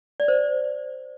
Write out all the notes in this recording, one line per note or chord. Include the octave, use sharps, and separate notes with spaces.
D5
C5